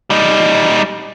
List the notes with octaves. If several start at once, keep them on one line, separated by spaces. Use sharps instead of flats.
G3 D#4